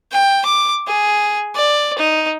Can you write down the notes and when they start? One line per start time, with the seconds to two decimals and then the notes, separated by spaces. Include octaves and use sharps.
0.12 G5
0.46 D6
0.87 G#4
1.55 D5
1.98 D#4